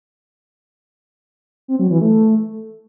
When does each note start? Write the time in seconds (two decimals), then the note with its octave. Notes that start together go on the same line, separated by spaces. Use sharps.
1.68 C4
1.79 F#3
1.90 E3
2.01 A3